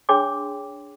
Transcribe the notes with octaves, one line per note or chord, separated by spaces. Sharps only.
D4 G#4 C#5 G5 C6 D6